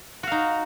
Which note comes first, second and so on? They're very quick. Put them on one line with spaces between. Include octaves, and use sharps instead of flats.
F#4 F5 D#4